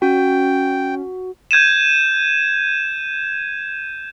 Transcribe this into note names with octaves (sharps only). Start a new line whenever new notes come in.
C#4 F#4 G5
G6 G#6 D#7 E7